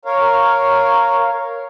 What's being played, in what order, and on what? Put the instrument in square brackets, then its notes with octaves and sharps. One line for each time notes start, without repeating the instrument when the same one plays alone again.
[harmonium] A#4 C#5 F5